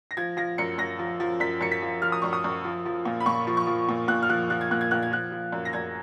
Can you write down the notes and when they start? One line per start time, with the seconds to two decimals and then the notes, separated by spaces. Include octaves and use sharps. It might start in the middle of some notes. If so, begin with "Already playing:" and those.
0.11 A#6
0.17 F3 G#6
0.37 F3 A#6
0.58 F#2 C#7
0.78 F#2 A#6
0.99 F3
1.20 F3
1.40 F#2 B6
1.61 F#2 C#7
1.72 B6
1.82 F3
2.02 F3 F6
2.12 D#6
2.22 F#2 C#6
2.33 D#6
2.44 F#2
2.64 F3
2.85 F3
3.05 A#2
3.20 B5
3.26 A#2 C#6
3.47 F3
3.57 C#6
3.67 F3
3.89 A#2
4.08 A#2 F#6
4.22 F6
4.29 F3 F#6
4.50 F3 F#6
4.61 G#6
4.71 A#2 F#6
4.81 G#6
4.91 A#2 F#6
5.03 G#6
5.12 F3 F#6
5.32 F3
5.52 F#2
5.65 A#6
5.73 F#2 G#6